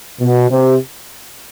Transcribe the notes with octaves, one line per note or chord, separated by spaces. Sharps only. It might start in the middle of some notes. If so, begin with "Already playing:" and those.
B2
C3